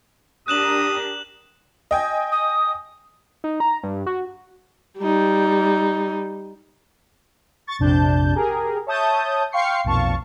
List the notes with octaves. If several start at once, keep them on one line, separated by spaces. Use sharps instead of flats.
D4 G4 A#4 D#6 F#6 E7 F#7
D#5 G5 G#5
D#6
D#4
A#5
G2
F#4
G3 D#4
C#6 A6
A#1 F2 C3 D4 A5 G6
G4 G#4 A#4
C#5 E5 A5 D#6 G6
F5 G5 C6 C#6 C7 C#7
B1 F2 A#2 F5 A5 C#6